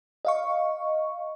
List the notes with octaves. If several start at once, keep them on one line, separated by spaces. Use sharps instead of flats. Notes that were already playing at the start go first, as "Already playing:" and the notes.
D#5 F5 C#6